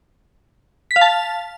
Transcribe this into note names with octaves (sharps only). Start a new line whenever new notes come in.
B6
F5
A5